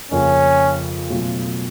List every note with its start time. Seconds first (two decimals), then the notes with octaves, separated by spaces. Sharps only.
0.11 F2 C#3 F3 A#3 C#4
1.09 B2 F#3 A3 C#4 F4